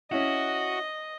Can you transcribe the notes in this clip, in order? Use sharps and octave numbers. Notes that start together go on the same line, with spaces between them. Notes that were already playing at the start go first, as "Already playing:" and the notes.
C#4 E4 F#4 D#5